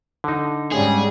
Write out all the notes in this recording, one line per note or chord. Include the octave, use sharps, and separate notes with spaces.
D3 D#4
G#2 C#3 G3 G#3 G#4